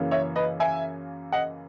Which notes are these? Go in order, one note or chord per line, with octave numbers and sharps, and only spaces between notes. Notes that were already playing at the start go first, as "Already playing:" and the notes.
Already playing: F#2 C#3 E3 A#3
C#5 E5
B4 D#5
E5 G#5
D#5 F#5